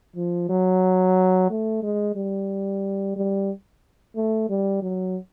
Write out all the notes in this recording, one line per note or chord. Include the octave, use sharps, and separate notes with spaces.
F3
F#3
A3
G#3
G3
G3
A3
G3
F#3